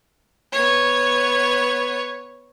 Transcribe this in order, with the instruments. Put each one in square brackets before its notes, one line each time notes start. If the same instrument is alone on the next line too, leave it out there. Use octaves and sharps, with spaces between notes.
[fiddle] B3 C#5